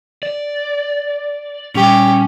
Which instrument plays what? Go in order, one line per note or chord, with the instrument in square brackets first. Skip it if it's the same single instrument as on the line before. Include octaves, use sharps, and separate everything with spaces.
[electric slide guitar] D5
[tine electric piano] A#2 G3 C#6 [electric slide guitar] C#4 [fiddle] G4